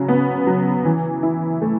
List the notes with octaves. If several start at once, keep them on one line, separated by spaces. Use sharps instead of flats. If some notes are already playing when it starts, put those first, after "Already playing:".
Already playing: C#3 F#3
B3
F#3
E3
E4
A3